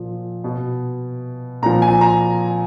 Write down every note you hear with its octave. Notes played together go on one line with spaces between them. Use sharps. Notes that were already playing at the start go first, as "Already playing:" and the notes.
Already playing: A#2 F3
B2
A#2 F3 A#5
G#5
A#5